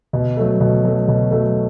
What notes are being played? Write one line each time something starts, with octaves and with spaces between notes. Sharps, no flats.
B2
F#3 A3
B2
F#3 A3
B2
F#3 A3